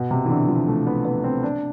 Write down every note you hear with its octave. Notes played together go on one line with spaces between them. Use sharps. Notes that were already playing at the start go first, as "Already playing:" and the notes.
Already playing: B2
C3
E3
D3
F3
A3
B3
B3
C4
D4